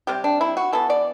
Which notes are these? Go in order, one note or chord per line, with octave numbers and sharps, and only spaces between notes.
C3 G3 C4 G4
D4
E4
F#4
E3 B3 A4
D5